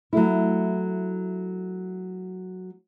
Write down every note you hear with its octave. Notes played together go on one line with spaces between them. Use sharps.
F#3 A3 E4